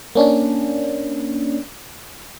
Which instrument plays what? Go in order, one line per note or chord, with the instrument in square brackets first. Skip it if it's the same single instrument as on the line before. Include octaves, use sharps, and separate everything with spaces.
[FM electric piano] A#3 C#4 D4